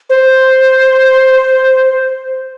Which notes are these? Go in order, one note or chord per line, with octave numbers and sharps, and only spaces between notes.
C5